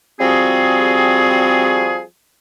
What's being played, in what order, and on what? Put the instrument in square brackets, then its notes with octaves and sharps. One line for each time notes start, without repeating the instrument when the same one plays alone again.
[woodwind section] F3 G3 C4 F#4 G#4